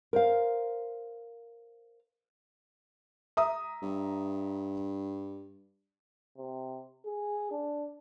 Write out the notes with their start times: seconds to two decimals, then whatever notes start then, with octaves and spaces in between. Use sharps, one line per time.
0.13 A#4 C5 F5
3.37 E5 A#5 D#6
3.82 G2
6.37 C3
7.06 G#4
7.51 D4